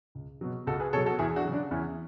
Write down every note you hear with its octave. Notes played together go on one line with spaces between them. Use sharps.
C#2
B2 F#3
C#2 F#4 A4
G#4 B4
B2 F#3 A4 C#5
F#4 A4
E2 E4 G#4
D4 F#4
C#3 F#3
D4
E2 C#4 E4